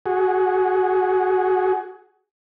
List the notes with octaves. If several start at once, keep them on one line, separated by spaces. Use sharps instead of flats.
F#4 G#4